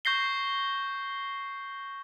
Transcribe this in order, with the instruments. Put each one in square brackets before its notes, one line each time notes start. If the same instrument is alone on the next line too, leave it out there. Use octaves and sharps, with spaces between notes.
[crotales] C#6 G6 A#6 C7 G7